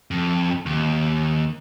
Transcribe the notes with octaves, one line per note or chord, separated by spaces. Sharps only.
F2
D#2